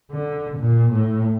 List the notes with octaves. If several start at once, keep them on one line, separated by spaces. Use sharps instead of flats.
D3
A#2
A2